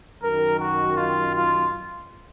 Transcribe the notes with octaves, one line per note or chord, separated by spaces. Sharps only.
F#2 D#3 A#4
F#4
F4
F4